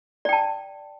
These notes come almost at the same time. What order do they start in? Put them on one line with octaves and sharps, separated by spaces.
D5 G5 A5